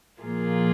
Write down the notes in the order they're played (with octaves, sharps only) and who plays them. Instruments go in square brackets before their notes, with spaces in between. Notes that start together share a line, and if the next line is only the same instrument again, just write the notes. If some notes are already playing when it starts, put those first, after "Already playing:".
[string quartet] A#2 F3 A#3 F4 G#4